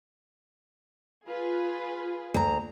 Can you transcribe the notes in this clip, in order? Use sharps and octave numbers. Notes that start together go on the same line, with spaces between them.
F4 G#4 B4
D2 A#5